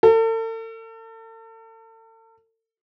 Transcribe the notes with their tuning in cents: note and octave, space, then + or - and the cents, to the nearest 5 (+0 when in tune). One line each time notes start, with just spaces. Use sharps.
A4 +40